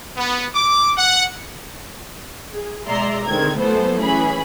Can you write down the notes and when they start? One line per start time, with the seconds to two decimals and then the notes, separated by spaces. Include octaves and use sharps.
0.17 B3
0.54 D6
0.98 F#5
2.53 G#4
2.87 B1 G#3 D5 E5 A#5 C6
3.26 D3 D#3 G#3 C4 G#6
3.57 E3 F#3 A3 B3 A4 C5
3.99 E3 C#4 G#4 B5